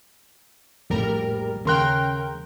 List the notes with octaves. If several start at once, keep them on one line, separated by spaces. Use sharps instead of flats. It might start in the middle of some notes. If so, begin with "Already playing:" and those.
A#1 F2 A2 G3 A#4
D#2 C#3 A#4 G5 C6 F#6